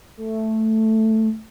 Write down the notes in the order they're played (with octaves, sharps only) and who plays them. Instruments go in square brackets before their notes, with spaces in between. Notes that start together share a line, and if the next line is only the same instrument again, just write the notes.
[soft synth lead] A3